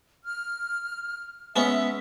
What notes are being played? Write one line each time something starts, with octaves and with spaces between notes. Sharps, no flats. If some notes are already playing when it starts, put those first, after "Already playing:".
F6
G#3 B3 C#4 E5